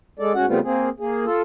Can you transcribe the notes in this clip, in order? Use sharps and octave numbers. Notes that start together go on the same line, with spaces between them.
G#3 A4 D5
G#2 C#4 F#4 F#5
C#3 G3 A3 B3 C4 F4
A#3 C4 G#4
A#3 G#4
F4 A4